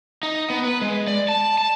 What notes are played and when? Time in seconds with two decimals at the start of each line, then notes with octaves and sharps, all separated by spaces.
0.23 D#4
0.50 B3
0.65 B4
0.82 G#3
1.08 D5
1.29 A5
1.58 A5